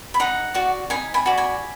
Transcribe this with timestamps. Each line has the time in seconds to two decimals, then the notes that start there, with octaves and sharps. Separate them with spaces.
0.14 B5
0.20 D#4 F#5 A#5
0.54 F#4 D5
0.90 D#4 G#5 B5
1.14 G#5 B5
1.26 F#4 D5
1.37 G#5 B5